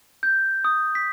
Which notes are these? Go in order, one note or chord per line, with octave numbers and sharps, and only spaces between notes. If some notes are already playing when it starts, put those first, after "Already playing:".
G6
D#6
B6